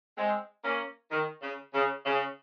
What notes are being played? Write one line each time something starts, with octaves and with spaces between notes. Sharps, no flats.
G#3 C4
A#3 C#4
D#3
C#3
C#3
C#3